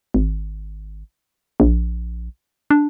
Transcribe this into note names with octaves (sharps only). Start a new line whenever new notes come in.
G#1
A#1
D4